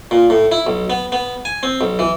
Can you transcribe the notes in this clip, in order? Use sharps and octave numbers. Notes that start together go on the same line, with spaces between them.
A#2
A2
E4
B1
B3
B3
G#5
C4
B1
E3